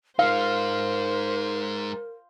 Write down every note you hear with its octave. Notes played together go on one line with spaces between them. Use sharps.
G#3 D#4 A#4 C5 F5